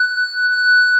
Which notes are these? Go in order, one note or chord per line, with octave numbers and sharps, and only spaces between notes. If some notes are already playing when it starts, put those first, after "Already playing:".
Already playing: F#6
F#6